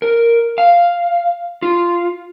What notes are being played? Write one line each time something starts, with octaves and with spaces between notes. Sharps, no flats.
A#4
F5
F4